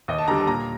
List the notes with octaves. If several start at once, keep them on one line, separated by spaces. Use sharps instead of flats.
D#2 D#5
A5
D3 G3 A#5
A5
A#2 A#5